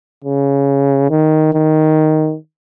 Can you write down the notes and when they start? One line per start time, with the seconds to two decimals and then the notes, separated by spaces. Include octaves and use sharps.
0.24 C#3
1.10 D#3
1.53 D#3